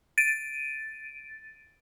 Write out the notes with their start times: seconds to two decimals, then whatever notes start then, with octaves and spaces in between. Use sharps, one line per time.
0.18 A6 D7 D#7